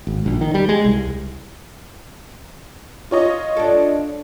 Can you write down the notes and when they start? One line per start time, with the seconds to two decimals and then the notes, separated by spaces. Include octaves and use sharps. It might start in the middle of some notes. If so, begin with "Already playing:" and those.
0.07 G#1
0.26 A#1
0.41 D#3
0.54 G3
0.69 G#3
0.85 C2
3.11 F4 C#5 D#5
3.57 D4 A4